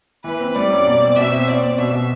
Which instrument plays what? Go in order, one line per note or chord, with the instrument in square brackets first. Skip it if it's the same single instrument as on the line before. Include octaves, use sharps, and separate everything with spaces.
[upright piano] E3 [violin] B4
[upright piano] C4
[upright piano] G3 [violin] D5
[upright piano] F#2
B2
C4
[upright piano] B2 [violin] E5
[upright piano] C4
[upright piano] C4 [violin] D5
[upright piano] C4
[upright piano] B2 [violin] E5
[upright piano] B2